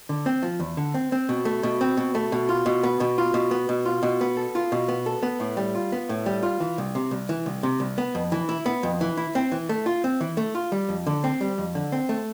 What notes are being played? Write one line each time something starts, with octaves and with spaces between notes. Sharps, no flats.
D3
C4
F3
E2
D3
C4
C4
B2
A3
B2
C4
B2
A3
B2
F4
B2
B3
B2
F4
B2
B3
B2
F4
B2
B3
A4
F4
B2
B3
A4
B3
A2
G3
F4
B3
A2
G3
F4
E3
C2
C3
C2
E3
C2
C3
C2
B3
F2
E3
E4
B3
F2
E3
E4
C4
E3
A3
F4
C4
E3
A3
F4
G3
F2
D3
C4
G3
F2
D3
C4
A3